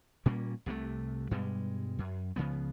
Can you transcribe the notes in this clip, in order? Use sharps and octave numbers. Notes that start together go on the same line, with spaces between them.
A#2 G3 A#3 C#4
C2 C3 F#3 A3
G2 B2 G3 G#3
F#2
C#2 C#3 F3 B3